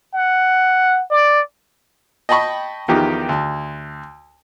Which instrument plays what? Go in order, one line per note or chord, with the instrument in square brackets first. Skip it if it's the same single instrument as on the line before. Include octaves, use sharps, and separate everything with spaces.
[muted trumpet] F#5
D5
[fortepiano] D#5 G5 A5 B5 C#6
E2 D#3 F3 D#4 G4 D#6
D2